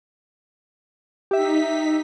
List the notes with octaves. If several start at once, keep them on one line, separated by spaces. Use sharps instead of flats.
D#4 G4 E5 B6